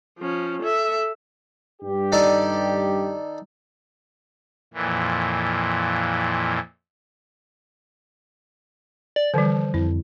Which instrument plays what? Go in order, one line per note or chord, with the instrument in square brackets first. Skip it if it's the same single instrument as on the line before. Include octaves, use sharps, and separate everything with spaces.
[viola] F3 C#4
A4 E5
[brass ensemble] G2 G4
[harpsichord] D#3 A4 D5
[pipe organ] F2 A#2 E3
[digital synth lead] D5
[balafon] D3 E3 G3 [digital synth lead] F3
[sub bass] F2 [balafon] E4